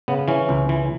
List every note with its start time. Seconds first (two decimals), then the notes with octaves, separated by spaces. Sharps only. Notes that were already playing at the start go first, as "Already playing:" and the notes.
0.08 C#3 B3
0.28 E3 C#4
0.49 C#2
0.69 E3